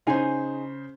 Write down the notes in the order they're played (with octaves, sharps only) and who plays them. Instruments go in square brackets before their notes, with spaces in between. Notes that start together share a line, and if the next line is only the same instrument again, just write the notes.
[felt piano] C#3 C5 [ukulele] D#4 G#4 G#5